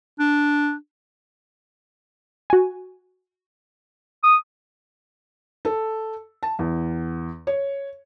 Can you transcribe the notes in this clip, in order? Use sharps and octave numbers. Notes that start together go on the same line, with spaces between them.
D4
F#4 G#5
D#6
A4
A5
E2
C#5